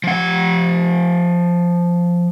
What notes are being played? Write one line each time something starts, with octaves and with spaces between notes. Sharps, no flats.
F3 F#5